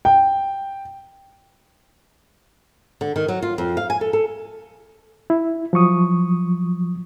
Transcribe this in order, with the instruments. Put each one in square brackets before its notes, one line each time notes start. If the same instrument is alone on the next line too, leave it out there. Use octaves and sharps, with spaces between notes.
[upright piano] G5
[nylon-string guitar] D3
D#3
F#3
F4
F2
F5
G#5
A4
A4
[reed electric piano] E4
F3 F#3 C#6 D#6